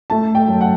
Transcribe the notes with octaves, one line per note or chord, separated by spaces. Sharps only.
A3 A5
G5
F#2
F#5